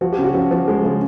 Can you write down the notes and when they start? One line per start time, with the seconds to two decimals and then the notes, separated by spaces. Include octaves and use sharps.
0.01 F3 F#4
0.13 G4
0.18 C#3
0.24 F#4
0.34 F3
0.51 F3
0.68 G#3
0.84 C#3